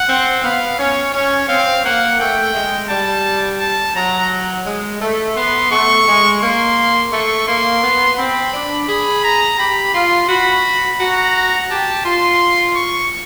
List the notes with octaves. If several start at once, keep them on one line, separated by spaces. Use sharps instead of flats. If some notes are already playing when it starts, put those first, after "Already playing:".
Already playing: F#5
C4
B3 F5
C#4 C#5
C#4 C#5
C4 F5
A#3 F#5
A3 G5
G#3
G3 A5
A5
F#3 A#5
G#3
A3
B3 C6
A3 C#6
G#3
A#3 C6
A3 C#6
A#3 C6
B3
C4 B5
D4
G#4 B5
A#5
G4 B5
F4 C6
F#4 B5
F#4 A#5
G4 A5
F4 C6
C#6